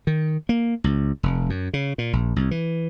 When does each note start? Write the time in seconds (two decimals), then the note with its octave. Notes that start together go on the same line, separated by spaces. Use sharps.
0.07 D#3
0.49 A#3
0.84 C#2
1.23 F1
1.50 F#2
1.73 C#3
1.98 A#2
2.13 A#1
2.36 C2
2.51 E3